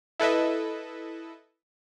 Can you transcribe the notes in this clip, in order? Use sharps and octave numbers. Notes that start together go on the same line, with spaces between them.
E4 A4 B4 D#5 E5